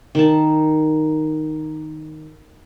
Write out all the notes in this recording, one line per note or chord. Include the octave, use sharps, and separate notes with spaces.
D#3 A5